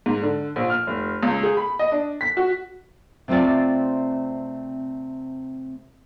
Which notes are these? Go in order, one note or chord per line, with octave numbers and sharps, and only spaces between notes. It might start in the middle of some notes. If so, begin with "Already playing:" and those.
G#2
D3
A#1
F6
F1
C#2
G#4
B5
D#5
D4
B6
F#4
C3 A3 C4 F4 D5